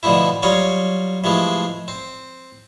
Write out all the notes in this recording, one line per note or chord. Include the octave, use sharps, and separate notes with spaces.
B2 D3 F3 A3 E4
F#3 G3 F4 C#5 D#5
C3 E3 F3 G#3 A3
C4